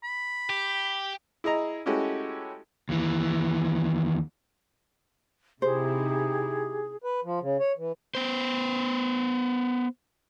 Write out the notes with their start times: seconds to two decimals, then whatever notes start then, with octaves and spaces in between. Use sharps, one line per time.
0.04 B5
0.49 G4
1.44 E4 G#4 D#5 A#5
1.86 G#3 A3 C#4 E4 F#4 G4
2.89 D#2 E3
5.62 C3 D#4 E4 G4 G#4 C5
7.04 B4
7.24 F3
7.42 C#3
7.59 C#5
7.78 E3
8.15 B3 C5